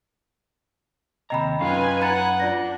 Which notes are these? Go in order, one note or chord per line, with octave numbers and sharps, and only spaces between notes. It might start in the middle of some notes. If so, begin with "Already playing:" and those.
D#2 C3 D#5 G5 A#5 B5
F#2 C#4 D#4 F4 B4 F5 G#5
F#5 A#5 B5 A6
D4 F4 D5 A#6